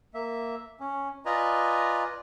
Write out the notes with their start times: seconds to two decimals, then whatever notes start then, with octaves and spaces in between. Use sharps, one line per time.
0.14 A#3 E5
0.80 C#4
1.26 F4 B4 D5 D#5 G#5 A#5